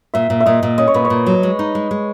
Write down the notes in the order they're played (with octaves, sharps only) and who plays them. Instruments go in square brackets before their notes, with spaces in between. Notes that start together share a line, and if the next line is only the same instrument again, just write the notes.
[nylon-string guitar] A#2 [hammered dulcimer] E5
[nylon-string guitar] A#2
[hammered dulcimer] E5
[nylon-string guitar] A#2 [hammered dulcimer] D#5
[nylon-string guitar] A#2
[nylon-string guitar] C#4 [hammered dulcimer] D#5
[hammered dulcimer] C#5
[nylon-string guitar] A#2 [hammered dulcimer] B4
[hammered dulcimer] C#5
[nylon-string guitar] A#2
F#3
G#3
D#4
G#3
G#3